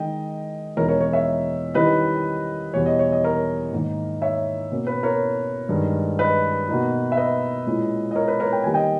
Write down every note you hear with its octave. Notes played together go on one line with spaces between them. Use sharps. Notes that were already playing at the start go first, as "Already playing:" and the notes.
Already playing: D#3 G#3 D#4 D#5 G5
E2 B2 G#3 D#4 A#4 C#5
A#4 C#5
A#4 C#5
C#5 E5
D#3 G3 C#4 E4 B4 D#5
E2 B2 G3 C#5
D#5
C#5
D#5
A#4 C#5
G#2 D#3 A#3 D#4
C#5 E5
B2 A#3 C#4
B4
A#4 C#5
G2 D#3 G#3
B4 D#5
B2 A#3 D#4
E5
B4 D#5
A#2 G#3 C#4 E4
D#5
A#4 C#5
B4
A#4 C#5
G5
D#3 G3 A#3 G#5
D#5 G5